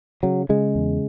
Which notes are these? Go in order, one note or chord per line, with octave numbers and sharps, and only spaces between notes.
C#3 F#3
C#3 G#3
E2